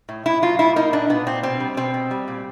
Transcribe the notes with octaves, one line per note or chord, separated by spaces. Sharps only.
A2
A2 E4
F#3 F4
A2 E4
A#3 D#4
A#2 D4
A#2 B3
A#2 C4
B2 C4
G3
B2 C4
B2
G3
A#2